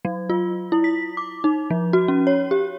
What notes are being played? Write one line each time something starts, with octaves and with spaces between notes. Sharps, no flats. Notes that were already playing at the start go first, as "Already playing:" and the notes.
F#3
F4
E4
B6
D6
D#4
F3
F#4
C#4
C#5
G4